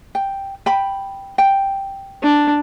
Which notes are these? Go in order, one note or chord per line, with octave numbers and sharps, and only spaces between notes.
G5
G5 B5
G5
D4